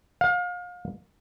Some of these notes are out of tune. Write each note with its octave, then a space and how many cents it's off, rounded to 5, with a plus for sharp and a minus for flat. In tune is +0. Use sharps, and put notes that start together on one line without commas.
F5 +35